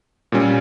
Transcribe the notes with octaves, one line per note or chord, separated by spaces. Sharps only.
A#2 G3 C#4